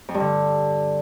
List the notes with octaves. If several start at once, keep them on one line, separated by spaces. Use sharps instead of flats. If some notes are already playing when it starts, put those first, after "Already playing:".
F2
G2
D3